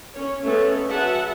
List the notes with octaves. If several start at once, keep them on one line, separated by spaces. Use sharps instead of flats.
C#4 C#5
G#3 A3 B3 C#4 A4 C#5
F#3 G#4 B4 E5 F#5 A5